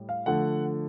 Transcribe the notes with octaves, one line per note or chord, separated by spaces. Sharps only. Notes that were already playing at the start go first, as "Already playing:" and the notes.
Already playing: A2 G3
F5
D3 F3 A3 F#5